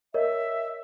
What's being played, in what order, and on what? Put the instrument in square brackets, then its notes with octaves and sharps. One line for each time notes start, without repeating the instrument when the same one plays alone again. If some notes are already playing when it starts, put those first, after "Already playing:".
[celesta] A#4 C#5 D#5 [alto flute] E5